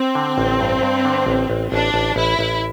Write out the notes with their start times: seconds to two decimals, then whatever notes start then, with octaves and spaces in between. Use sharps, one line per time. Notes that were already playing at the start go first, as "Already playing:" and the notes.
Already playing: C4
0.15 D3
0.38 A1
0.60 G2
0.82 G2
1.05 D3
1.27 A1
1.50 A1
1.72 A1 D4
1.94 A1
2.16 A1 E4
2.39 A1